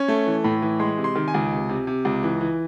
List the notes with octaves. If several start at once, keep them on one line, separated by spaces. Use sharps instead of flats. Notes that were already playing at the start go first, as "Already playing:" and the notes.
Already playing: C#4
A3
E3
A2
E3
G#3 C6
C3
C6
D#3
G#5
C#2
C3
C3
C3
C#2
E3
E3